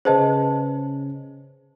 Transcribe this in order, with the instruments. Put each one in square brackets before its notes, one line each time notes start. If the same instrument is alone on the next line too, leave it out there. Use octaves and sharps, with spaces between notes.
[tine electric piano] C#3 C#4 [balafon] G#4 B4 D#5 [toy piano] C5 A5